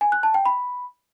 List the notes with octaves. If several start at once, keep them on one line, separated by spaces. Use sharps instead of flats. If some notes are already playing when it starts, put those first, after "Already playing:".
G#5
F#6
A5
G5
B5